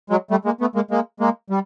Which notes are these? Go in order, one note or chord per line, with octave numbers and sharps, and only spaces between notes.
F#3 G#3
G3 A3
G#3 A#3
A3 B3
G#3 A#3
G#3 A#3
G#3 A#3
G3